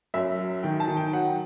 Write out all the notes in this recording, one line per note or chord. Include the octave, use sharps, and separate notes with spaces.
F#2 E5
F#3
D#3 G5
A5
D#3
G5
F#3 F#5